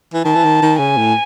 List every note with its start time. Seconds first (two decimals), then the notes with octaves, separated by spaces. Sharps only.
0.14 E3
0.25 D#3 A5
0.35 E3
0.44 D#3
0.62 D#3
0.79 C#3 G#5
0.97 A2